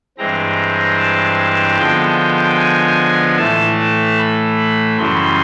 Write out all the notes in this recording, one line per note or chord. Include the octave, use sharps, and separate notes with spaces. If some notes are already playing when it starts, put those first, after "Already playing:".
G2 E3 G#3 C4 A#5
A5
D3 F3 G#3 B3 G5
G#5
A2 E3 A3 A5
B5
F#2 C#3 E3 G3 C6